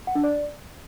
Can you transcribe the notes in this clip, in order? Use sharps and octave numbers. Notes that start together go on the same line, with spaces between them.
F#5
D4
D5